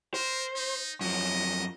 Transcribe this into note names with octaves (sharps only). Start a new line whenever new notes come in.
A#4 C5
D#4
F#2 F3 D#5